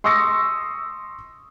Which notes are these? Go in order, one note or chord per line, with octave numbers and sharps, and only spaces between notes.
C6 C#6 D#6 E6 A#6 C#7